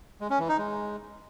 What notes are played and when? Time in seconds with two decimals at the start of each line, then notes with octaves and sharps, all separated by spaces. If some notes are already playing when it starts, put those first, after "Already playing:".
0.21 G#3
0.30 C#4
0.40 E3
0.49 D#4
0.58 G#3